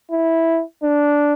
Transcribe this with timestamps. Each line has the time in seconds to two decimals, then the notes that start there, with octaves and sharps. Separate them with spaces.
0.11 E4
0.83 D4